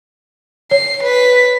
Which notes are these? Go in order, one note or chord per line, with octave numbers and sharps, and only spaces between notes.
C#5 C7
B4 B6